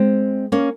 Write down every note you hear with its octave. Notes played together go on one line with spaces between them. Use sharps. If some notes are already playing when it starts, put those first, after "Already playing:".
Already playing: G#3 C4
A#3 C#4